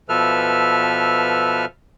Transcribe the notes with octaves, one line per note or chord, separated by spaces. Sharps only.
B2 F3 A4 B4 E5 F6